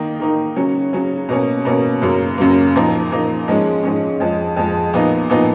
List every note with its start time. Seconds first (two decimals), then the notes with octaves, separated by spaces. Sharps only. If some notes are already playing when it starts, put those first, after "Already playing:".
Already playing: D#3 A#3 D#4
0.20 D#3 A#3 D#4
0.56 C#3 F#3 C#4
0.93 C#3 F#3 C#4
1.29 B2 A#3 C#4
1.65 B2 A#3 C#4
2.02 F#2 C#3 F#3 A#3
2.38 F#2 C#3 F#3 A#3
2.75 A#2 F3 A#3 D#4
3.11 A#2 F3 A#3 D#4
3.48 G#2 F3 G#3 C#4
3.83 G#2 F3 G#3 C#4
4.20 F2 F3 G#3
4.56 F2 F3 G#3
4.93 A#2 F3 B3 D#4
5.29 A#2 F3 B3 D#4